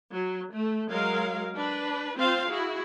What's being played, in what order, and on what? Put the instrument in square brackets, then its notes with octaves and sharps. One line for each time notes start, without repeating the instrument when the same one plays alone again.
[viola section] F#3
A3
F#3 G#3 A#4 F5
D4 B4
C4 F4 C5 F5
E4 F#4 G#4